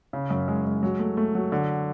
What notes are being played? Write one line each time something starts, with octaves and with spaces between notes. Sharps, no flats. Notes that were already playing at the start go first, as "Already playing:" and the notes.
C#3
F#2
G#3
G#3
F#3
A3
A3
F#3
D3